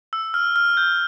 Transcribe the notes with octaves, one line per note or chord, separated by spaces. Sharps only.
E6
F6
F6
G6